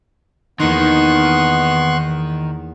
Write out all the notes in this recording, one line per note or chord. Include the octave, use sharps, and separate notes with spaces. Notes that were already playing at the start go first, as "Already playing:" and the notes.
E2 D#3 A#3 B3 D#4 C6 C#6 F#6